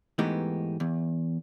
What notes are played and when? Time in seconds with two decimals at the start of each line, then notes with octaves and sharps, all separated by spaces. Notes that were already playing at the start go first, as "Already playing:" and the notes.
0.18 G#2 E3 A3 B3 D#4 G4
0.80 E2